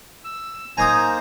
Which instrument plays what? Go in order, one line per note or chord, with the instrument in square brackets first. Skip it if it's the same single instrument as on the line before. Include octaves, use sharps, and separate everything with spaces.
[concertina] E6
[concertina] A#3 D#4 C5 [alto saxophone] G#5 [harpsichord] A#5 D#6